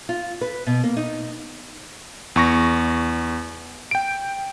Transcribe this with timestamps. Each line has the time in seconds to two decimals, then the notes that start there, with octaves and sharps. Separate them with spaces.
0.09 F4
0.41 B4
0.67 B2
0.84 A#3
0.97 D#4
2.36 E2 C#6 A#6
3.91 G5 D7